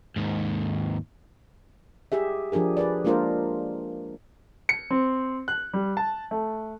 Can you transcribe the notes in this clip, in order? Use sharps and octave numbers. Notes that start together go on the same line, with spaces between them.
D#2 G#2
G4 G#4 E5
F3 D4 G4 G#4 A#4
G#4 B4 D5
G#3 A#3 D4 F4 A#4 C5
C#7
C4
F#6
G3
A5
A3